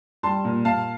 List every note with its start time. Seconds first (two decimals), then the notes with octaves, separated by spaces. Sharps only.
0.23 G3 A5 C6
0.45 A#2
0.65 A#2 F5 A5